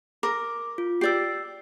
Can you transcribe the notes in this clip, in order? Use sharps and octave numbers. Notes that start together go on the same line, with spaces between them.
A#4 D6
F4
G4 D5 E6 C7